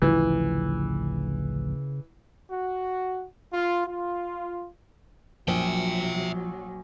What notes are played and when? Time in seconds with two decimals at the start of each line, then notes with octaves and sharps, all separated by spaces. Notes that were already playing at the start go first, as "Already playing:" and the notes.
0.02 A1 D2 C#3 E3 F3
2.51 F#4
3.53 F4
3.87 F4
5.48 A#1 F3 F#3 E5 G5